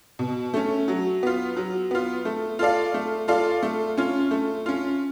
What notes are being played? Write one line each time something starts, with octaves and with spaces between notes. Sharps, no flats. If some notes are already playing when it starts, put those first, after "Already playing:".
B2
A3 C#4
F#3
B3 F4
F#3
B3 F4
A3
F4 A4 D5 F5
A3
F4 A4 D5 F5
A3
C#4 F4
A3
C#4 F4